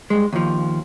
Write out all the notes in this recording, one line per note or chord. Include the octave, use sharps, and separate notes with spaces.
G2 G#3
D#2 F3